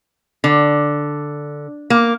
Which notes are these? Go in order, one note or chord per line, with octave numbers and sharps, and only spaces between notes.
D3
A#3